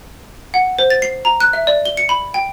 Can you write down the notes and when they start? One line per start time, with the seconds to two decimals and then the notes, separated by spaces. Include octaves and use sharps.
0.54 F#5
0.79 C5
0.90 A6
1.02 C7
1.25 A#5
1.40 F#6
1.53 E5
1.67 D5
1.85 G7
1.97 C#7
2.09 B5
2.34 G5